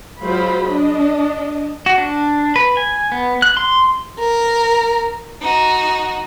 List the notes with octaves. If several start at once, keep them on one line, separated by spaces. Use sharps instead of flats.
F#3 G#3 F4 C5 B5
D4 D#5
F#4
D4
B4
G#5
B3
F#6
C6
A#4
D#4 F#4